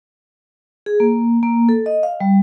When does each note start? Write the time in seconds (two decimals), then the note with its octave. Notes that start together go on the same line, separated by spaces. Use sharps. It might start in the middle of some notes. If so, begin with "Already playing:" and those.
0.86 G#4
1.00 A#3
1.43 A#3
1.69 A4
1.86 D#5
2.03 F5
2.21 G3